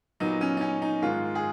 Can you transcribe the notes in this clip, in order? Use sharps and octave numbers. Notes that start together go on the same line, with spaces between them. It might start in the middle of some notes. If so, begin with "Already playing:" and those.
A#2 F#3 B3 D#4
C#4
D#4
C#4
D#4
G#2 D#3 G#3 F4
G#4